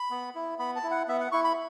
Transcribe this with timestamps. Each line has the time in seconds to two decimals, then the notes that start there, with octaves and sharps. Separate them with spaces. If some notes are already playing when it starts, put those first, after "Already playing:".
Already playing: B5
0.11 B3
0.35 E4
0.59 B3 B5
0.76 A5
0.83 E4
0.91 F#5
1.08 B3 E5
1.20 F#5
1.32 E4 C#6
1.44 B5